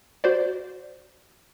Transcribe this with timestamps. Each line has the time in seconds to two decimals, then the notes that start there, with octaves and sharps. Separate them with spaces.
0.24 F#4 C5 D5